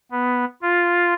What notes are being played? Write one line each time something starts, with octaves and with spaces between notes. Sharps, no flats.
B3
F4